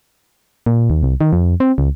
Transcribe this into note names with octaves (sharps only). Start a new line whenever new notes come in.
A#2
D#2
C2
D#3
F2
C4
C#2